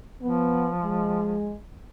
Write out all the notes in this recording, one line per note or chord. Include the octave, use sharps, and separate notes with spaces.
F3 B3
G#3